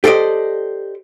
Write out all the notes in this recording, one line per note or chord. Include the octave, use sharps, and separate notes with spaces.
G4 A4 C5 D5 D#5